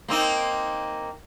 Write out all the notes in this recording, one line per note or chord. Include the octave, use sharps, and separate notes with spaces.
A#3 C4 D#4